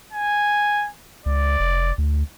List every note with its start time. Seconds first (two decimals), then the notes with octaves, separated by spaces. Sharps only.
0.13 G#5
1.26 C#2 D5
1.60 F1
1.98 D2